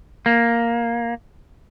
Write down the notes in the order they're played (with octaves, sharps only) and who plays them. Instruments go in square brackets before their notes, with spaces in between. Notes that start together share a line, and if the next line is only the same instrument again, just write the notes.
[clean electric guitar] A#3